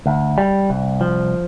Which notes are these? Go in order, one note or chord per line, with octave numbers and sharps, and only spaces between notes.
D2
G3
C2
F3